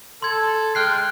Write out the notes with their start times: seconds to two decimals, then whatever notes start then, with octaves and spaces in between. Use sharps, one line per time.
0.22 A4 C6 G#6
0.75 G#3 G5 F6 F#6 C7